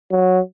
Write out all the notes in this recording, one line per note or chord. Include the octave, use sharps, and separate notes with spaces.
F#3